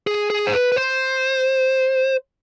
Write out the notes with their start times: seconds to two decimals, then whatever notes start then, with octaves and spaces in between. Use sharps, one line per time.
0.07 G#4
0.30 G#4
0.47 C5
0.53 B4
0.72 B4
0.76 C5